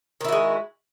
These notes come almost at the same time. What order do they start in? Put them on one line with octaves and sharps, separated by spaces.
D#3 E4 F#4 G#3